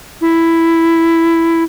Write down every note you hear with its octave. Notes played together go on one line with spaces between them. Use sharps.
E4